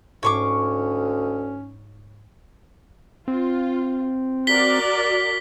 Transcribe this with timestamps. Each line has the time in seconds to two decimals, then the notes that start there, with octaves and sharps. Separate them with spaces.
0.23 D2 G#2 C#4 C#5 A5 C#6 D6 C7
3.28 C4 F4
4.47 F#4 A#4 D5 B6 G7